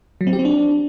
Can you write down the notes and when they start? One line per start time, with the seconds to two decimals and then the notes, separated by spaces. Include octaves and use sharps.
0.21 F#3
0.27 C4
0.33 G4
0.39 C4
0.45 D4